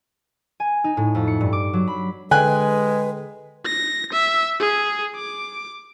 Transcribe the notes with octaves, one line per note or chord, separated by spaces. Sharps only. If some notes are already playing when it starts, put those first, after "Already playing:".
G#5
D#4
A2
F2
C#7
G2
D6
F#3
B5
D3 G#3 B4 G5 G#5 F#6
A#6
E5
G#4
D6